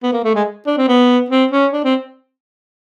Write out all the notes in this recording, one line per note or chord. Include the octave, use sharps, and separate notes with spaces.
B3
A#3
A3
G#3
D4
C4
B3
C4
C#4
D4
C4